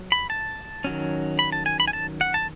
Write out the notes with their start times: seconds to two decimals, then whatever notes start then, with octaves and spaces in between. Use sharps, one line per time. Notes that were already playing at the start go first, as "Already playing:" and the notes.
Already playing: F#3
0.12 B5
0.30 A5
0.84 D#3 F#3 C#4
1.39 B5
1.52 A5
1.66 G#5
1.80 B5
1.88 G#5
1.93 A5
2.21 F#5
2.34 A5